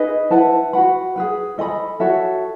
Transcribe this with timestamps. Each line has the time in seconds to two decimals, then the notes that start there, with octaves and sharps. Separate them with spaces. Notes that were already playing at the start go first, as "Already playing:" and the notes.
Already playing: D#4 G#4 B4 D#5
0.30 E4 B4 F#5 A5
0.73 F#4 B4 F#5 B5
1.16 G#4 B4 F#5
1.58 A4 D#5 G#5 B5
2.00 F#4 A4 C#5 E5